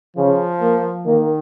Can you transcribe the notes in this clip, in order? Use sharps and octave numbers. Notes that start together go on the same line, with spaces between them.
C#3 F3
A#3
D#3 A#3